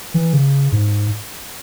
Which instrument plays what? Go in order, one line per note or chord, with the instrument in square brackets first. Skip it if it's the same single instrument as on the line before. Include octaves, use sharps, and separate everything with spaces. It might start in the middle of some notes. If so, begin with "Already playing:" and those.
[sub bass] E3
C#3
G#2